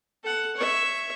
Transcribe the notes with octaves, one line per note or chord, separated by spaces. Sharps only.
A4 F#5
C#5 E5